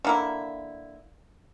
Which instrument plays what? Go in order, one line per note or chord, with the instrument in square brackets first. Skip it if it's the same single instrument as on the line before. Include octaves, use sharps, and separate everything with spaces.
[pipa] D3 A#3 E4